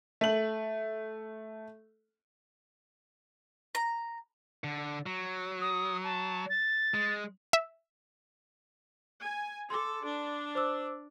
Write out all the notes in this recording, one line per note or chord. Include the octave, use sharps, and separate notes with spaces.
A3 F#7
A#5
D3
F#3
D#6
A5
A6
G#3
E5
G#5
A4 C6 D6
D4
C5 D6 E6